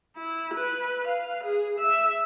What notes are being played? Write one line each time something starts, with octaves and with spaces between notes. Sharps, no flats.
E4
B4
F5
G#4
E5